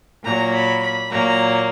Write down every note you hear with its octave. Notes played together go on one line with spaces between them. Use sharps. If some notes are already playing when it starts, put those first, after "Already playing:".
A#2 F#3 A#3 A#5
B5
B5
A#2 F#3 A#3 A#5